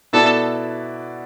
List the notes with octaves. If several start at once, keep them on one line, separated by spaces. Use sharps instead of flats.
B2 B3 E4 A4 D5